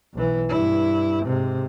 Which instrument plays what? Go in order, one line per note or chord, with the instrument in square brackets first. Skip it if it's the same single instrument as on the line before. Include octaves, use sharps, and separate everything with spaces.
[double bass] B1 E3
G2 E4
G#2 C3